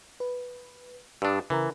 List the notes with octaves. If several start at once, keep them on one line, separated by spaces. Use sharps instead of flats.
B4
G2 D4 D#6 E6
C#3 E3 A#4 A#5